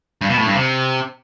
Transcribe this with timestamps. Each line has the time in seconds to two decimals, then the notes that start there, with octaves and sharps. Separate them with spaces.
0.21 G2
0.30 B2
0.38 A2
0.46 G2
0.55 C3